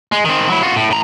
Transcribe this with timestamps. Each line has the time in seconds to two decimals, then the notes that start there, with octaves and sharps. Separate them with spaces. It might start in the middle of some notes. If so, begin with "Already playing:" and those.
0.12 G#3
0.25 D#3 C4
0.50 F#3 E4
0.63 F4 F#4
0.76 A2
0.90 A2 A#5